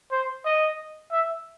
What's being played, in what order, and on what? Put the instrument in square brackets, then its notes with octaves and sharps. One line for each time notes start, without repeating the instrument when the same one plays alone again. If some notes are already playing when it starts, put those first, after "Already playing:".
[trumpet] C5
D#5
E5